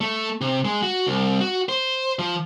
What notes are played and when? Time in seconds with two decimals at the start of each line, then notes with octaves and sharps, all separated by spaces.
0.01 A3
0.41 C3
0.65 G#3
0.83 F#4
1.07 C2
1.41 F#4
1.69 C5
2.19 F3